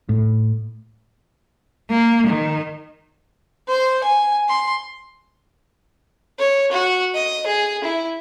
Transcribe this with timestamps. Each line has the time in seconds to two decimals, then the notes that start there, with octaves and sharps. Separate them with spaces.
0.09 A2
1.90 A#3
2.28 D#3
3.68 C5
4.04 G#5
4.48 C6
6.39 C#5
6.72 F#4
7.14 D#5
7.46 G#4
7.84 E4